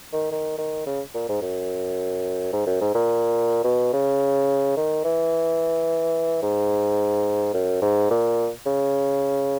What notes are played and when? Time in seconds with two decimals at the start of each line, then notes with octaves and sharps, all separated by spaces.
0.13 D#3
0.32 D#3
0.58 D#3
0.87 C#3
1.15 A#2
1.29 G#2
1.42 F#2
2.53 G#2
2.67 F#2
2.81 G#2
2.95 A#2
3.64 B2
3.93 C#3
4.77 D#3
5.05 E3
6.43 G#2
7.54 F#2
7.82 G#2
8.11 A#2
8.66 C#3